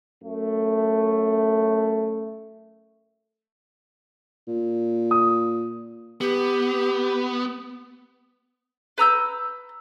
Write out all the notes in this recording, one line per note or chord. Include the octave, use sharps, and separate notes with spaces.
F#2 A3
A#2
D#6
B3 G4
B4 A#5 E6 G6